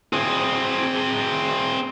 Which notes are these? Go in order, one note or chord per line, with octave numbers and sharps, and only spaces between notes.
C4 G#4